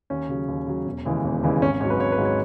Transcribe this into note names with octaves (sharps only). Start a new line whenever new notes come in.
D#2 C#4
C#3 F#3
D#2
C#3 F#3
E1
D#2 C#3 E3 G#3
E1
D#2 C#3 E3 G#3
G#1 C#4
G#2 F#3 C#5
B4
G#1 C#5
B4
G#2 F#3
C#5